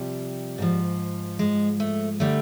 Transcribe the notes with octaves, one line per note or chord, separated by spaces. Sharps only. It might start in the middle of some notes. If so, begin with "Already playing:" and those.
Already playing: C3 F3 G3
G#2 F3
G#3
A3
D3 G3 A3